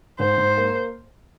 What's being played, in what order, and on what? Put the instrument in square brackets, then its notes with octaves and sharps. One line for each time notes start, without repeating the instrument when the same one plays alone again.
[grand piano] G#2 [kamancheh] C5
[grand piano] G#2
A#3